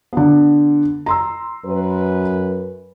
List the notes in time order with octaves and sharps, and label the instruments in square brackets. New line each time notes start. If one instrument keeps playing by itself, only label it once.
[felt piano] D3 B3
A#5 C6 E6
[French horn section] F#2 B4